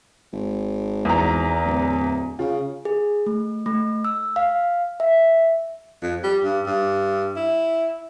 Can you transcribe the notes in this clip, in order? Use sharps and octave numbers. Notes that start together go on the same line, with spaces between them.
G#1
E2 A#5
D1
C#3 F4
G#4
A3
A3
E6
F5
E5
F2
G3
G2
G2
E4